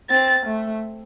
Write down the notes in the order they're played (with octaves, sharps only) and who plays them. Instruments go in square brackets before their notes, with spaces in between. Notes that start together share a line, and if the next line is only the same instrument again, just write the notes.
[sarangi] C4 [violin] A6
[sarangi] A3